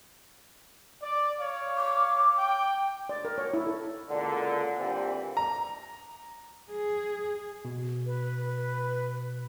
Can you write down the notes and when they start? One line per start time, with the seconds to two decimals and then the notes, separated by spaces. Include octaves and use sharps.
1.02 D5
1.39 C#5 F5
1.77 D6
2.38 G5
3.09 D5
3.25 A#4
3.38 C#5
3.54 E4
3.67 A4
4.09 C#2 A#2 D3
4.77 A#2 D3 E3 G3 C4
5.37 A#5
6.71 G#4
7.65 B2
8.06 B4